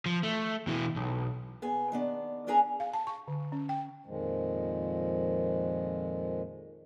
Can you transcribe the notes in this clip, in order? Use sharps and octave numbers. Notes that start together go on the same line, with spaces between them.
F3
A3
B2 E3
B1
B3 G#4 G#5
D#3 B3 D4
B3 C#4 D4 G#4 G#5 A#5
F5
A5
C#6
D3
C#4
G5
F2 A#2 D#3 F3 G#3